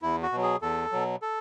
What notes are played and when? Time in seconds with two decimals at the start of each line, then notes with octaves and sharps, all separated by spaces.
0.02 E2 E4
0.22 F#4
0.32 B2 F#3
0.43 G#4
0.62 E2 A4
0.92 B2 F#3
1.22 A4